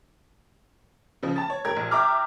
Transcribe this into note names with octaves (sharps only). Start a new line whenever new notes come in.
C#3 F3
A5 A6
C#5
G2 A#4 G#6
A#1
E5 G5 A#5 D6 F6